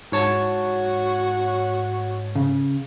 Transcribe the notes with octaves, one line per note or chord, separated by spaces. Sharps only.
G#2 F#4 C#5 A5
C#3